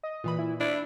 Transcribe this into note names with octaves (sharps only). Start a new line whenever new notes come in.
D#5
A#2 E3 B5
E4
D4 E4